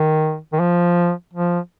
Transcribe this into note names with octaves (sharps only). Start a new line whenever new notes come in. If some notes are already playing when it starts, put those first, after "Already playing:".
Already playing: D#3
D#3
F3
F3